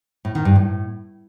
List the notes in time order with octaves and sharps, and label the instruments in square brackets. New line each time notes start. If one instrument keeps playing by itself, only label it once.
[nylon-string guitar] A2
D#3
G2
A2